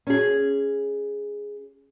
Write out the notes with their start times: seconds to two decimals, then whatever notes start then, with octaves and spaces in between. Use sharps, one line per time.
0.07 C#4 G#4